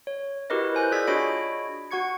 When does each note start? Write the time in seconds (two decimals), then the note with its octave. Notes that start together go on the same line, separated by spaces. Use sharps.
0.07 C#5
0.50 E4 F#4 G4 A#4 B4 D#5
0.74 C5 G#5 F#6 G6
0.92 F4 G#4 D5 E6 G#6 B6
1.07 D4 F#4 C#5 D#5 B5 D7
1.91 F#4 F#5 C#6 G#6 C#7